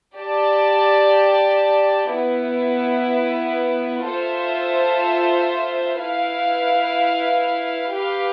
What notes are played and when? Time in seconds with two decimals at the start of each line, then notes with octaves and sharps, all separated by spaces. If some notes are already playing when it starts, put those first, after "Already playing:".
0.15 G4 D5 A5
2.09 B3 E4 B4
4.03 F4 A4 C5 E5
5.98 E4 B4 F5
7.92 G4 B4 F5